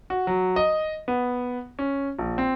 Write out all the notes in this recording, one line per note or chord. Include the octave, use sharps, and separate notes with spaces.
F#4
F#3
D#5
B3
C#4
A#1
C4